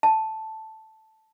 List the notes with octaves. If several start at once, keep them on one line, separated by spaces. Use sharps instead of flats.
A5